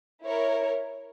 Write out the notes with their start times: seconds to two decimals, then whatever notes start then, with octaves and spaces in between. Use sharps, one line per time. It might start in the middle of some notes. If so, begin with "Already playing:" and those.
0.24 E4 A#4 C#5